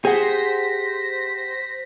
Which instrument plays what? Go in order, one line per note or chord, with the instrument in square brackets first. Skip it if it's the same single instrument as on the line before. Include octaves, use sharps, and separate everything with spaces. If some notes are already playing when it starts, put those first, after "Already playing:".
[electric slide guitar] G4 F#5 [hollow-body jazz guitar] G#4 [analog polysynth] C5 A#6 B6